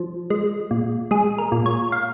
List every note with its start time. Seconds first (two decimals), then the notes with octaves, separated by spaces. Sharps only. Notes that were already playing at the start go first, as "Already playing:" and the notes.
Already playing: F3
0.30 G#3
0.71 A#2
1.11 G#3 G#4
1.38 A#4
1.52 A#2
1.66 C#5
1.92 F5